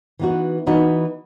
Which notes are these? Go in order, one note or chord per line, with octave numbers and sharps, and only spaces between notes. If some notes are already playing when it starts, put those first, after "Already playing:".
E3 B3 D#4 F#4
E3 B3 D#4 F#4